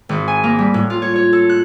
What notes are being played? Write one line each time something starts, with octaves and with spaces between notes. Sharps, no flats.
G#1
G#5
A#3
G3
A2
F4
C#5
C#5
A4
F#6